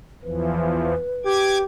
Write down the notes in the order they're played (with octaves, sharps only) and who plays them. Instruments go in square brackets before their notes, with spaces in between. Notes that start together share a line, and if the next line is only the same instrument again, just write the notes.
[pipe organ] E2 E3 F3 [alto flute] B4
[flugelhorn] G4 [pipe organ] D6 G#6